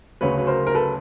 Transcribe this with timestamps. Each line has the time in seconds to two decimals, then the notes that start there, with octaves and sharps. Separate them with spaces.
0.21 D2 C#3 F#3 B4 C#5
0.38 B4
0.47 A#4 C5
0.67 A#4
0.75 A4 B4